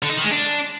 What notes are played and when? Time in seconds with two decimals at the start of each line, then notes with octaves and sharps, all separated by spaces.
0.03 D3
0.10 D#4
0.17 D#3
0.24 G#3
0.31 D4